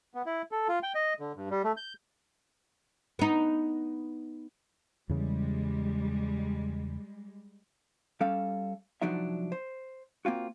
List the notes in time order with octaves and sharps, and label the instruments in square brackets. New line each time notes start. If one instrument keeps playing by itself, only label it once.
[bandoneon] B3
E4
A4
F4
G5
D#5
D3
G2
G3
A3
G6
[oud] B3 D#4
[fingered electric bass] E2 C#3 [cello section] G3 G#3
[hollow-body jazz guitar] G3 C#4 A4 F5
C2 F3 F#3 D4 D#4 E5
C5
A#3 C4 F4 F#4